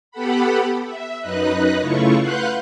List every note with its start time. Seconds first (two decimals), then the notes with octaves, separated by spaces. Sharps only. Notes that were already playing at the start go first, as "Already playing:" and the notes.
0.11 B3 G4 A4 F#5 B5
0.84 E5
1.20 F#2 D#4 B4 D#5 F#6
1.80 C#3 A3 E4 F4 C#6
2.20 B4 F5 F#5 C6 F#6 G6